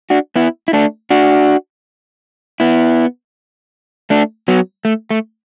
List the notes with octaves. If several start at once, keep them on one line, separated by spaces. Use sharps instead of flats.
D4 F#4
B3 E4
E4
A3 D4
D4 F#4
B3 E4
A3 D4
F#3 B3
A3
A3